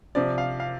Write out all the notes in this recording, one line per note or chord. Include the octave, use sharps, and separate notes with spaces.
C3 F3 D5
F5
F5